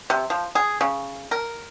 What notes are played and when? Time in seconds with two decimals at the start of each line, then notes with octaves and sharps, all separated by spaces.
0.10 C3
0.30 F3
0.55 G#4
0.81 C#3
1.31 A#4